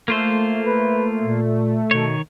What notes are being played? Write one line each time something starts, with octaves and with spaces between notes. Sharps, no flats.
A3 A#3 F4 C5
B4
A#2
B2 D#3 C#5